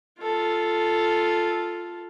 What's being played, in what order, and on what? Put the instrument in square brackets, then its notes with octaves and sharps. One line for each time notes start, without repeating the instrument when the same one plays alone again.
[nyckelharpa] F4 A4